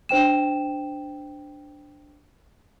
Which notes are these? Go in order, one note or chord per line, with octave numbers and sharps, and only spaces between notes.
D4 C5 G5 E7